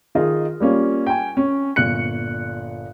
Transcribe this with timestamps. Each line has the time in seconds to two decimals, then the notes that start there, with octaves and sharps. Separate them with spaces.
0.15 D#3 D#4 F4 G#4 D#5
0.60 G3 A#3 C#4 F4
1.07 G5 G#5
1.37 C#4
1.76 G1 A#2 F#6 C#7